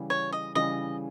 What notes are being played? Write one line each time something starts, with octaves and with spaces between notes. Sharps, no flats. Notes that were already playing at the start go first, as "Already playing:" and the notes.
Already playing: C#3 E3 G3 C#4
C#5
D#5
C#3 E3 G3 C#4 D#5